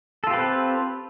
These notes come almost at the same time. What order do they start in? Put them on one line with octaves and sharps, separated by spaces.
A4 F4 G4 B4 C4